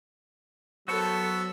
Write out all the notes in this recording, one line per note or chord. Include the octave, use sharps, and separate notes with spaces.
F#3 B3 F#4 A4 C5 C#6 E6